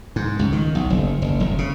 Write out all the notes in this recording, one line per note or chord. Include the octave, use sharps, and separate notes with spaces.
G#2
C#2
D#3
B1
F#1
F#1
F#1
C#3